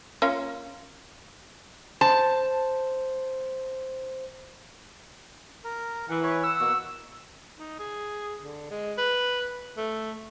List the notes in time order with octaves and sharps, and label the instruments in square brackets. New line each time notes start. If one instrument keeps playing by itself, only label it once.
[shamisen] A#3 C#4 F4
[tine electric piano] C5 [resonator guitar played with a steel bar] A5
[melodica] A#4
[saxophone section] E3 [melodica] F#5
[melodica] B4 C#5
[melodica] F#5 [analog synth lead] E6
[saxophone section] B2 A#3 F#4
[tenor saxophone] D#4
G#4
D3
G#3
B4
A3